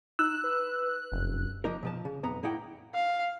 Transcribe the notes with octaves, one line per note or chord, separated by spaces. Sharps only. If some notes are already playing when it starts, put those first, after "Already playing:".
D#4 E6 F#6
B4
F1 F#2
F3 A#3 D#4 A#4
B2 F3 A5
C#3
B1 F2 B3 A#5
A2 A#3 D#4 E4 F#5 G5
F5